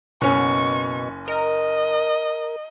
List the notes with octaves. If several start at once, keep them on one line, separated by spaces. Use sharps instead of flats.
F#1 B2 C#4 C#6
A#4 D#5